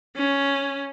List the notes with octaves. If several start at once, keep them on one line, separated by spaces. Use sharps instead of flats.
C#4